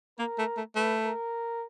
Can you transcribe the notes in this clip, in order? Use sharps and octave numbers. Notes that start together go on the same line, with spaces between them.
A#3 A#4
A3
A3
A3 B4
A#4